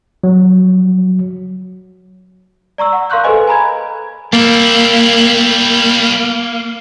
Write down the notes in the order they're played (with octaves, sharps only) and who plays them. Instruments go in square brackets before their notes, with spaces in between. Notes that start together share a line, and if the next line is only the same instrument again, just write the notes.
[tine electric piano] F#3
[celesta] D5 A#5 C#6 E6
F#5
A#4 F5 C6 C#6 F#6 G6
G#4 A4 B4 C5 D#5 G#5
G#5 A#5 B5 G#6
[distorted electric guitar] G3 E4 [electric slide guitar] A#3